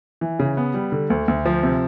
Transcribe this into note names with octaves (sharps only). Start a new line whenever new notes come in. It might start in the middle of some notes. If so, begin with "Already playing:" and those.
E3
C#3
B3
G3
D3
D2
D2
F3
C3